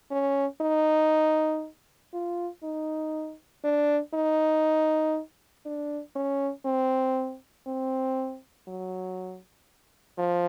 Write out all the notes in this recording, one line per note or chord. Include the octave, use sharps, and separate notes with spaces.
C#4
D#4
F4
D#4
D4
D#4
D4
C#4
C4
C4
F#3
F3